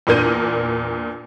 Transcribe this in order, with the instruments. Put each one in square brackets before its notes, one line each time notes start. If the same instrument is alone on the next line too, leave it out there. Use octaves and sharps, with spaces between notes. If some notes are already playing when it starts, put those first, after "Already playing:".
[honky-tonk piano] E2 A#2 D4 A#4 G6 D#7